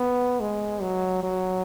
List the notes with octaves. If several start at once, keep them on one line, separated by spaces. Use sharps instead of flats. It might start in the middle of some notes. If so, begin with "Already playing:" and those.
Already playing: B3
G#3
F#3
F#3